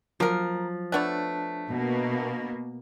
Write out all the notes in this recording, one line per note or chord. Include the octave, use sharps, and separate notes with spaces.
F3 F#3 A#3 A#4
A3 B3 D4 C#5 A5 F#6
B2 A#3